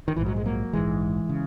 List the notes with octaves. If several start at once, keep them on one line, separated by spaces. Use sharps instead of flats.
D#3
A#1 G#2 E3
F#3
G#3
F#3 A#3
A#1 G#2 E3 G#3
C#3